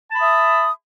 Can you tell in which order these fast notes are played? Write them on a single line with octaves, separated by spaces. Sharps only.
A5 B5 D#6 E5